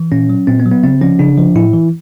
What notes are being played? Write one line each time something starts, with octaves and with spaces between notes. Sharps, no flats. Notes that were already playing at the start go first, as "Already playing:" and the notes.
Already playing: E3
A#2 C#4
F#3
A#2 C4
B3
F#3
B3
C#3 C4
F3 C#4
C#3 D4
F3
A2 E4
E3